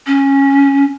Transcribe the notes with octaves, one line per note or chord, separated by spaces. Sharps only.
C#4